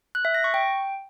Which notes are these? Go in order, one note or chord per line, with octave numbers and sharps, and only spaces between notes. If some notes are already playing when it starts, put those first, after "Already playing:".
F#6
E5
A#6
C#6
G5